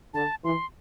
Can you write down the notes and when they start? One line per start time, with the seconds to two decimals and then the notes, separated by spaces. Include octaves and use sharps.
0.14 D3 A5
0.44 E3 C6